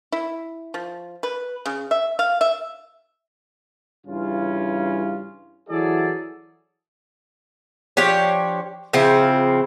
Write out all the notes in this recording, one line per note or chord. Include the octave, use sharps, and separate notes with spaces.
E4
F3
B4
C#3
E5
F5
E5
G2 C#3 E3 C#4 F4
E3 F#3 E4 G#4 A4 D5
F3 D4 G4 C#5
C#3 F3 C4 E4